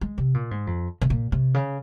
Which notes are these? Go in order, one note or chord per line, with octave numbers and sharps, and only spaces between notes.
G#3
C3
A#2
G#2
F2
C3
A#2
C3
C#3